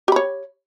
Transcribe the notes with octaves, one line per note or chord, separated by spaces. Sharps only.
G4 C#5 B5